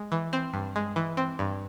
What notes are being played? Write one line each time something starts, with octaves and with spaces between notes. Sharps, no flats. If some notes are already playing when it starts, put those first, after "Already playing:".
Already playing: G#3
E3
C4
G2
G#3
E3
C4
G2